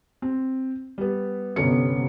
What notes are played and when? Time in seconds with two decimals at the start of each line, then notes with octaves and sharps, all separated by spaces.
0.22 C4
0.98 G3 B3
1.56 G1 C3 B3 C#4 C#7